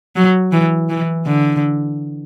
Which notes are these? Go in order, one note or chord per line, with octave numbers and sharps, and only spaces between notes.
F#3
E3
E3
D3